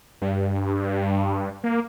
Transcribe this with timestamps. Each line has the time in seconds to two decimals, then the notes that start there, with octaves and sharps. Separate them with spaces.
0.22 G2
1.64 A#3